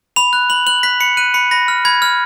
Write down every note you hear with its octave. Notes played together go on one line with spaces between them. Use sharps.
B5 F7
F#6
B5 F#7
F#6 F#7
F#6 B6
B5 C#7
F#6 D#7
B5 C#7
B5 A#6
F6
B5 G#6
F6